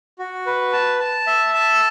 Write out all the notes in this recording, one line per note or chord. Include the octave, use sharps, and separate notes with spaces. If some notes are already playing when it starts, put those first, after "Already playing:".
F#4
B4
A5
A5
E5
A5